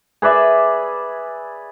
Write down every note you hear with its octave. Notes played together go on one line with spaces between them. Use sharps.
G#4 B4 D5 E5